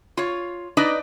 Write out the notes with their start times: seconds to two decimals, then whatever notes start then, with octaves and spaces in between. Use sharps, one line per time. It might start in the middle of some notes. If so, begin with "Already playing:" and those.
0.17 F4 C#5
0.77 D4 D#4 B4 D5 D#5